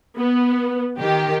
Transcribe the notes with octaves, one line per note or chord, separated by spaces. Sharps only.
B3
D#3 G4